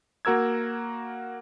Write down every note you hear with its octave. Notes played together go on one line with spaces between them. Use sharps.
A#3 F#4 A#4 E6 G#6